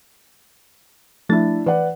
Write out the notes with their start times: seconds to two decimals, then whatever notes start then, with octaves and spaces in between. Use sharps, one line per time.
1.29 F3 A3 D4 E4 A6
1.66 E3 B4 D5 F#5